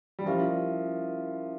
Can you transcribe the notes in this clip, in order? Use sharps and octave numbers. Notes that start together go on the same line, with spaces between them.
G3
F3 C#4 E4 A#4 E5